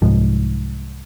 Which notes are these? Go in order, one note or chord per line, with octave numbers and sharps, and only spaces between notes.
C2 G#2 F3